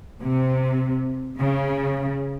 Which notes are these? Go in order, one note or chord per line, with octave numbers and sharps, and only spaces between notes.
C3
C#3